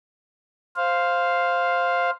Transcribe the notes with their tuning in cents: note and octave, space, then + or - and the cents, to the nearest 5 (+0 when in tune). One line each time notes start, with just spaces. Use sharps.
C5 +0 F5 +0